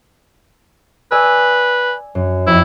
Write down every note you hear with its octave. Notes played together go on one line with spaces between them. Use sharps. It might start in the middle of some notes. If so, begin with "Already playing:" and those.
B4 D5 G#5 E6
F#2
F2 E4